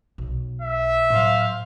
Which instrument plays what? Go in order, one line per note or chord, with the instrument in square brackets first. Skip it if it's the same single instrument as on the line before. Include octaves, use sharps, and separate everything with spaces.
[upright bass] B1
[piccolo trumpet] E5
[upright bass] A2 F#3 [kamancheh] C5 F5